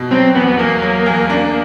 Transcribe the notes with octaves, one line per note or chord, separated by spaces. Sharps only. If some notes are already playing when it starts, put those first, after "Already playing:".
Already playing: B2
F#3 C4
E2 B3
B3
E2 A#3
F#3
E2
D4